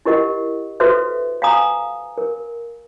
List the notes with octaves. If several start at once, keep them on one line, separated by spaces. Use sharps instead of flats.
E4 G4 A#4 D#5 F#5
F#4 A4 B4 C5 E5
F5 F#5 G#5 A#5 D#6
A#4